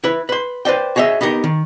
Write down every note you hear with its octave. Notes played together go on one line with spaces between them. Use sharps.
E4 B4
B4 C6
B4 C5 D5 G5
F#4 G#4 C#5 D#5 E5
B3 D#4 G4 A#4
D#3